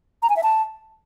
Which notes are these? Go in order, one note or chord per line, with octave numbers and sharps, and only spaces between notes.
A#5
G#5
E5
A5